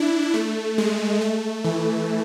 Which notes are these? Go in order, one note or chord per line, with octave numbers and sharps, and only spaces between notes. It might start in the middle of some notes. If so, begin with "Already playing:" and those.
Already playing: D4 E4
A3
G#3
A3
E3